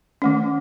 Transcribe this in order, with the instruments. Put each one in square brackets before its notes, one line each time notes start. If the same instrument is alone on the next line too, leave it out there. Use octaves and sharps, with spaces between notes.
[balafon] D#3 A3 C#4